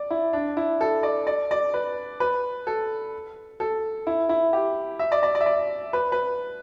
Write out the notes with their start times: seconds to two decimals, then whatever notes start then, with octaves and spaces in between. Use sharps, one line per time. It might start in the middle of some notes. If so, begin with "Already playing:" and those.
Already playing: D5
0.10 E4
0.33 D4
0.57 E4
0.81 A4
1.03 D5
1.27 D5
1.51 D5
1.74 B4
2.20 B4
2.67 A4
3.60 A4
4.07 E4
4.29 E4
4.53 G4
4.99 E5
5.12 D5
5.23 D5
5.35 D5
5.41 E5
5.46 D5
5.93 B4
6.12 B4